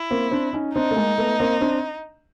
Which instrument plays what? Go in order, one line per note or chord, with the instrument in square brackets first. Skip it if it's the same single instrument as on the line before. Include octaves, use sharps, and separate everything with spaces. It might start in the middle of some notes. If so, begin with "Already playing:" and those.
Already playing: [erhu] E4
[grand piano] A#3 C4
C4 D4
C#4 D#4
[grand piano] C4 D4 [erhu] D#4
[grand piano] A3
G#3 A#3
A3 B3
A#3 C4
C4 D4